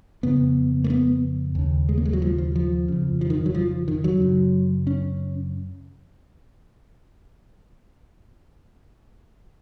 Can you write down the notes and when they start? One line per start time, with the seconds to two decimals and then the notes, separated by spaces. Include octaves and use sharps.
0.23 F2 C#3 B3
0.84 A#3
0.90 B3
1.55 D#2 C#3
1.89 G#3
1.98 A#3
2.06 G#3
2.13 F#3
2.22 F3
2.38 F3
2.56 F3
2.88 F2 C#3
3.21 F3
3.30 D#3
3.46 F#3
3.55 F3
3.88 D#3
4.04 F#3
4.20 F#2 C#3
4.87 C#4